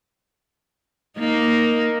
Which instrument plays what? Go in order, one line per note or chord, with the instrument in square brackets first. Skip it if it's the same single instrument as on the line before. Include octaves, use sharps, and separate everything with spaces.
[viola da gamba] A#3 D#4